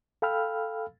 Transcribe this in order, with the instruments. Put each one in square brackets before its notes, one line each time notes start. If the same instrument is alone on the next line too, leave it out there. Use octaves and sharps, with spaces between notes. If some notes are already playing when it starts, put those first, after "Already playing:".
[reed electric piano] A4 F5 G5 B5 E6 F6